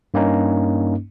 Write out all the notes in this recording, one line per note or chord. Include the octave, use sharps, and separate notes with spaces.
G2 A#3 C#4 D#4